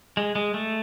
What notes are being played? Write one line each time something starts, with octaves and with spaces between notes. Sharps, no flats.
G#3
G#3
A3